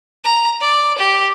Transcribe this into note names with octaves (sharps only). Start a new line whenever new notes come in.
A#5
D5
G4